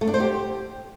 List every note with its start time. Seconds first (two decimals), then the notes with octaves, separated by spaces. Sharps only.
0.01 A3
0.07 D4
0.14 C5
0.20 G4